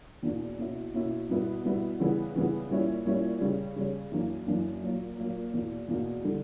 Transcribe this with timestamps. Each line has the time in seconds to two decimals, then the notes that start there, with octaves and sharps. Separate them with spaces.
0.23 E2 B2 A#3 D4
0.58 B2 A#3 C#4 E4
0.94 B2 A#3 C#4 E4
1.29 B2 G3 B3 E4
1.65 B2 G3 B3 E4
2.00 C#3 E3 G3 B3
2.35 C#3 E3 G3 B3
2.70 A#2 G3 C#4 E4
3.05 A#2 G3 C#4 E4
3.41 C#3 G3 C#4
3.76 C#3 G3 C#4
4.12 F#2 E3 A#3 D4
4.47 F#2 E3 A#3 D4
4.83 A#2 F#3 A#3
5.18 A#2 F#3 A#3
5.54 E2 B2 A#3
5.88 E2 B2 A#3
6.24 D3 G3